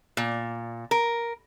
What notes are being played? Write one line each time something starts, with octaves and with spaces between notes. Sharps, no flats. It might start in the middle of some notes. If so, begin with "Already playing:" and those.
A#2
A#4